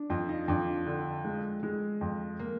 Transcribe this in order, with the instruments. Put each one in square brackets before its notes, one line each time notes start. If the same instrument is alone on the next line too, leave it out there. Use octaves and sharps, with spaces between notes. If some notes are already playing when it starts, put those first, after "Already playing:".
Already playing: [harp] D4
[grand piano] F2 [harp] F4
[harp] D#4
[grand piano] F2 [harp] D4
[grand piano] D3
G#3
G#3
F2
[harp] A#3